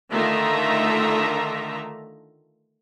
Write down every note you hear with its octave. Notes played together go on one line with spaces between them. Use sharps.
D3 D#3 A3 F4 E5 A#5